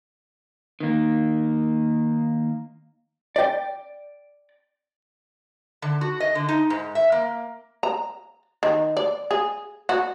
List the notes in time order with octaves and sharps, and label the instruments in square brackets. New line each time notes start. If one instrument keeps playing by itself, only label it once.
[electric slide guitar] D#3 A#3
[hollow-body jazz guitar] D5 G5
[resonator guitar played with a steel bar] D3
F#4
D#5
D3
D#4
G#2
E5
A#3
[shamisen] A#5
D#3
D5
G#4
F#4